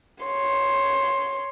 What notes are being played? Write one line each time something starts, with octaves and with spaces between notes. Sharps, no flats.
C#5 C6